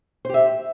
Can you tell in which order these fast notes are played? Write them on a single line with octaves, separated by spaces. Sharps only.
C5 G4 E5